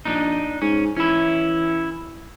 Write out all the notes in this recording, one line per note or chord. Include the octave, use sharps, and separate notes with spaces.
A#1 D4 D#4
G#2 C#4
E3 C#4 E4